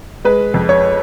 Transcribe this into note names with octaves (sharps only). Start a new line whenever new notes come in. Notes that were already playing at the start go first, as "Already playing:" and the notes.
G#3 B4
F2
C#5